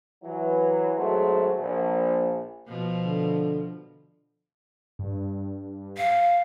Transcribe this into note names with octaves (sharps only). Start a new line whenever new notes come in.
E3 F#3 E4
G#1 F#3 G#3 A3 F#4 C5
A#1 A#2
B2 F3
D3
G2
F5